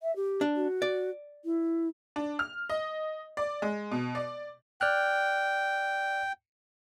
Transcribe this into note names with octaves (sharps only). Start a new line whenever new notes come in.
E5
G4
D4
F#4
D5
E4
D4
F6
D#5
D5
G#3
B2
D5
D5 G5 F6 F#6